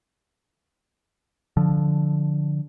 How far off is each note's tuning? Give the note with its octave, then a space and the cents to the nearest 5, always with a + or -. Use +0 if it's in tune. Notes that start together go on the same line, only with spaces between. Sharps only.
D3 +0 F3 +0